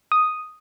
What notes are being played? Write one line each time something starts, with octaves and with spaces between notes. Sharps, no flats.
D#6